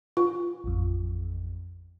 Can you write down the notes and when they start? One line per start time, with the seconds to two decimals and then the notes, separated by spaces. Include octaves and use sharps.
0.17 F4
0.64 A1 F2